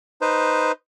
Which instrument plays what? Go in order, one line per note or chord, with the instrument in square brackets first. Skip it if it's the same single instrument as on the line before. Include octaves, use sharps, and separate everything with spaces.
[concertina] D#4 B4 C5